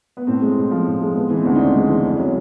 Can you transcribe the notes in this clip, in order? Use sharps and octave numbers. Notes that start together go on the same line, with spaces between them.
B3
A2 C4
G#3
A2
F3
A2
G#3
G#3 B3
E3
C4
D2
D#4
C#3 D4
G#3
E3
F2
F#3